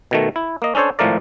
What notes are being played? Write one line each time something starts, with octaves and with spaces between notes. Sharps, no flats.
B2 D#3 A3
E4
A#3 D#5
C#4 D4 A4 C5 C#5
G#1 A2 F3 A3 A#4 D5